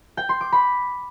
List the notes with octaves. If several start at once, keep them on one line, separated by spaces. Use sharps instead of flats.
G5
C6
D6
B5